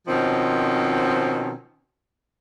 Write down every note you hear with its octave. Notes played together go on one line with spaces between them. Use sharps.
B2 D#3 F3 C4 C#4